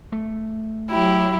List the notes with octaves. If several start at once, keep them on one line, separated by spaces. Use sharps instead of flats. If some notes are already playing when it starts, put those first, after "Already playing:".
A3
F#3 E4 G4